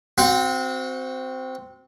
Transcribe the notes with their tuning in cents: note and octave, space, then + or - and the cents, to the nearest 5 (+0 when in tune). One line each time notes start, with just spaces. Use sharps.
C4 -10 F#4 +0 F#5 -45